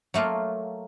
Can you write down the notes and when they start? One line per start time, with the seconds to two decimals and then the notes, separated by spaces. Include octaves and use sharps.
0.14 F#3 A3 A#3 F4